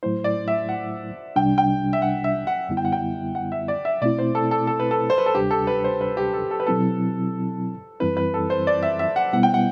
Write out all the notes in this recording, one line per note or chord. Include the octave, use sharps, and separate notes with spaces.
A2 F#3 A3 E4 C5
D5
E5
F#5
C2 C3 G3 D4 G5
G5
E5
F#5
E5
F#5
F#2 D3 G3 B3 E4
G5
F#5
G5
F#5
E5
D5
E5
B2 A3 C4 E4 D5
C5
A4
A4
A4
B4
A4
C5
B4
A4
D2 C3 G3 D4 G4
A4
B4
C5
B4
G4
A4
A4
B4
B2 F#3 C4 E4 A4
F#2 E3 G3 C4 E4 B4
B4
A4
C5
D5
E5
E5
F#5
B2 G3 B3 E4 F#5
G5
F#5